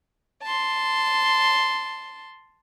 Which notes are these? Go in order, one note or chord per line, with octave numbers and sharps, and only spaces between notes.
A5 C6